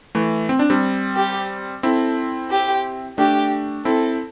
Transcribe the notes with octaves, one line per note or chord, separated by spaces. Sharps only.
E3 A3
C4
D4
G3 C4
G4
C4 E4 A4
G4
A3 D4 G4
C4 E4 A4